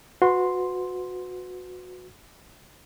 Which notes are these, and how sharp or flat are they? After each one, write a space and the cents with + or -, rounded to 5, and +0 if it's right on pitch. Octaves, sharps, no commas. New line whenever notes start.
F#4 -20 B4 +25 C6 +0